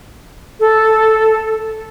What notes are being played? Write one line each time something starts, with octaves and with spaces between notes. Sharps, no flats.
A4